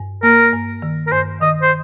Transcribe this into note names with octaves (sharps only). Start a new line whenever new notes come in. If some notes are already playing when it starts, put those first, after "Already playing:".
Already playing: G2
A#3 A#4
G2
D#3
A#4
G2 C5
D#3 D#5
C5